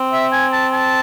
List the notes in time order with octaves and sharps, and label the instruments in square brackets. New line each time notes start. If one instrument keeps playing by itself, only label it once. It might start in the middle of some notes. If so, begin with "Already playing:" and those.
Already playing: [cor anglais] C4
[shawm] E5
G#5
A5
A5